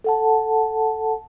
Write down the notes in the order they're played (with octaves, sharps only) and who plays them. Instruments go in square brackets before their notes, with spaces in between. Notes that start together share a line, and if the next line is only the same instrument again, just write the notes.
[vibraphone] A4 F#5 A5